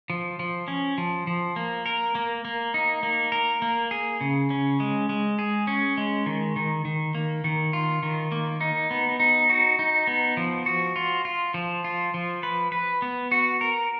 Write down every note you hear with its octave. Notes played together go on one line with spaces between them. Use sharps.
F3
F3
C#4
F3
F3
A#3
A#4
A#3
A#3
D#4
A#3
A#4
A#3
G#4
C#3
C#4
G#3
G#3
G#4
C#4
G#3
D#3
D#3
D#3
A#3
D#3
F4
D#3
A#3
D#4
B3
D#4
F#4
D#4
B3
F3
F#4
F4
F4
F3
F4
F3
B4
B4
B3
F#4
A#4